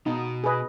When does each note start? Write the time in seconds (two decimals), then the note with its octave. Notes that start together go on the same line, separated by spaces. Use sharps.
0.06 B2 D#4
0.44 G#4 B4 D#5